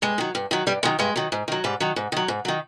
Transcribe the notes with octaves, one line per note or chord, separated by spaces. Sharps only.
G2 G#3
D#3 F#3
G2
D#3 F#3
G2 G3
D#3 F#3 G#3
G2 G#3
D#3 F#3
G#2
D#3 F#3
G#2 G3
D#3 F#3
G#2
D#3 F#3
G#2
D#3 F#3